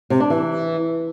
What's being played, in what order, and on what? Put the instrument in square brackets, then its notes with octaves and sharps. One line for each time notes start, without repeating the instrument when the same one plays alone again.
[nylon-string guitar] C3
D4
E3